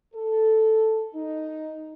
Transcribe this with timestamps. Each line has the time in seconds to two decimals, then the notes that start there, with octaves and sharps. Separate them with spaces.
0.14 A4
1.15 D#4